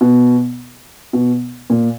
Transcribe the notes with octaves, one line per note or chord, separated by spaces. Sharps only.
B2
B2
A#2